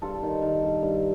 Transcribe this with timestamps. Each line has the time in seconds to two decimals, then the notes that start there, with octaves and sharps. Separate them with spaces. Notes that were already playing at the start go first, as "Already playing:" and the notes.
0.02 G2 F4 A4
0.23 D#3
0.42 D#3
0.63 G2
0.82 G2